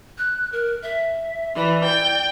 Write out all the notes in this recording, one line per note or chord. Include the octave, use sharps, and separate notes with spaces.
F#6
A#4
E5
E3 D5
G5